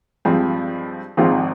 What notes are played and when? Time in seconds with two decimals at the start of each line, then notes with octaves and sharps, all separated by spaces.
0.25 G2 F3 G#3 C4
1.17 G#1 G#2 F3 C4 F4